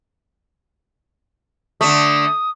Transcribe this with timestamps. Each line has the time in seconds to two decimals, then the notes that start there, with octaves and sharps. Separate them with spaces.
1.81 D3 A3 D#6